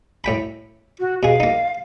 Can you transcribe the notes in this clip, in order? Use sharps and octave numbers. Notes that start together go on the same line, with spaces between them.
A2 G5 B5
F#4
B2 G#4 F5
A#3 D#4